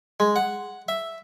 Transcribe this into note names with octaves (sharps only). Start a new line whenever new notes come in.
G#3
F#5
E5